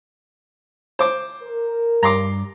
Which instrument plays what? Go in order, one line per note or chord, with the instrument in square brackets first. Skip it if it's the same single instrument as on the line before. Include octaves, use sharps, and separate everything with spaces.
[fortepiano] C5 D6
[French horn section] A#4
[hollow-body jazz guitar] G2 [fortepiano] A#5 C6 D6